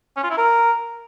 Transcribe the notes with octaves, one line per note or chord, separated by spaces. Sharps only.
C#4
F4
E4
A#4